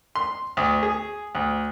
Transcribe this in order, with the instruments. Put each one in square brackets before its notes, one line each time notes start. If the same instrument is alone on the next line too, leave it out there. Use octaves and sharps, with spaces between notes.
[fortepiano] C6
D2
G#4
D2